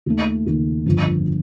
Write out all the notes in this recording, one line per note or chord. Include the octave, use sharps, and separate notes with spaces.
D#2 D#3 A3
D#2 D#3 A3
G1 F2 D3